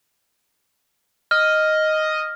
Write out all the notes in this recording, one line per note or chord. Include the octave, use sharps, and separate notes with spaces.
D#5 F6